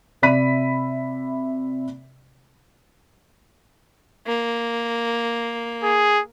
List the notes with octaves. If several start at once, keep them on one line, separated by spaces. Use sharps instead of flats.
C3 D5 E5 B5 B6 D#7
A#3
G#4